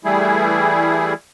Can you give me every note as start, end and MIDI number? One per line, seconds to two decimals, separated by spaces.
0.05 1.14 52
0.05 1.14 55
0.05 1.14 57
0.05 1.14 64
0.05 1.14 68